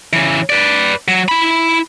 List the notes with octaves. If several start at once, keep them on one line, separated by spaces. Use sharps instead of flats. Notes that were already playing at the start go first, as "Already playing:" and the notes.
C#3 E3
B4 D5
F#3
E4 B5